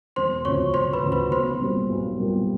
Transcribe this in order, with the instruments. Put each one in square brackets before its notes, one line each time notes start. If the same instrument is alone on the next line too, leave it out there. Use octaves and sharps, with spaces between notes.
[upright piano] E1 [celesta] C5 C6
[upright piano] D2 C#3 F3 [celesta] C#5 C#6
[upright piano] E1 [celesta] C5 C6
[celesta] B4 B5
[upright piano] D2 C#3 F3
[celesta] B4 B5
[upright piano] B1 [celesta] C5 C6
[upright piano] A#2 G3 A#3
B1
A#2 G3 A#3